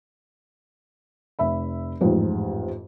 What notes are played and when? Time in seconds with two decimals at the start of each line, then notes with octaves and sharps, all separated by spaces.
1.39 F1 E5 B5
2.01 A1 F2 G#2 G4